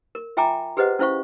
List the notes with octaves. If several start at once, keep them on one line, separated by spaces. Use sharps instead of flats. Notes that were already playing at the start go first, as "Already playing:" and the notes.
A#4
F4 E5 G5 G#5 A#5 D6
G4 G#4 B4 C5 D#5 F#5
C#4 E4 C5 F5 C#6